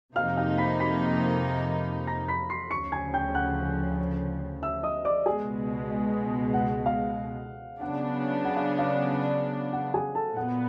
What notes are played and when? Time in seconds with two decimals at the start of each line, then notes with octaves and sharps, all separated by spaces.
0.16 F2 C3 F3 A#3 D#4 F5 F6
0.37 F5 F6
0.58 B5 B6
0.80 B5 B6
2.07 A#5 A#6
2.28 B5 B6
2.50 C6 C7
2.71 D2 C#3 F3 C#6 C#7
2.92 G#5 G#6
3.14 G5 G6
3.35 F#5 F#6
4.62 E5 E6
4.83 D#5 D#6
5.05 D5 D6
5.26 C#2 B2 G#3 G#4 G#5
6.54 F#5
6.86 F5
7.81 C#3 F#3 B3 D4 F#5
8.45 F#5
8.56 F5
8.78 F5
9.73 F#5
9.94 G#4 G#5
10.15 A4 A5
10.36 A#2 F#3 B3 F#5